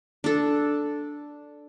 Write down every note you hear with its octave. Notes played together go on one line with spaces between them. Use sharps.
D4 A4